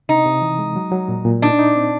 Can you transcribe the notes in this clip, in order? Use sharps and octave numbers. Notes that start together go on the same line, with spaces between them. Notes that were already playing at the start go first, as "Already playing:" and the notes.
C3 D#4
C3
E3
G#3
F#3
F#3
A#2
A#2
D4 D#4
D#4
C4